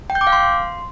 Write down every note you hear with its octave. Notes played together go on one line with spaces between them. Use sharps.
G5
G6
D6
F5
C6